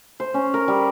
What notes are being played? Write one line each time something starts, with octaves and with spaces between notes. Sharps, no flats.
C5
C#4
A#4
G3